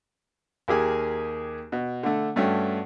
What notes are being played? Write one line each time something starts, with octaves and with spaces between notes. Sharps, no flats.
D#2 A#3 G4 G#4 G#5
B2
D3 A3
G2 A3 C#4 F#4 G5